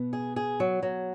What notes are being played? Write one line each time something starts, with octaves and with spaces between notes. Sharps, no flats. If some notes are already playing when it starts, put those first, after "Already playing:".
Already playing: B2 B3
G#4
G#4
F#3
F#3